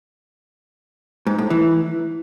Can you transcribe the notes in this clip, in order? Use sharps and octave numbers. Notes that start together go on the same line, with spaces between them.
G#2
A2
E3